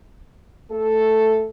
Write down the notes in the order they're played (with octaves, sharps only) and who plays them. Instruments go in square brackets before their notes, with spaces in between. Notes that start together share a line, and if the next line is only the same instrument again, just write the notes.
[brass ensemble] A3 A4